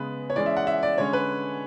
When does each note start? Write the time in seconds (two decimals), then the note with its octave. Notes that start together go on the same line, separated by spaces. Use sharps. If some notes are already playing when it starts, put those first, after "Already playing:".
Already playing: C#3 G#3 B3 B4
0.30 C#5
0.36 E3 G#3 C#4 D5
0.46 E5
0.57 F#5
0.67 E5
0.83 D5
0.98 D3 G#3 C#4 C#5
1.13 B4